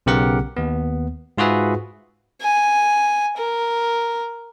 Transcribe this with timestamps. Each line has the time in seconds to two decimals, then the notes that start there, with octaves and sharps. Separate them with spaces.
0.06 B1 C#3 B3 G4 A#4 F#5
0.57 D#2 B3
1.38 G#2 F4 F#4 G#4 B4 E5
2.41 G#5
3.37 A#4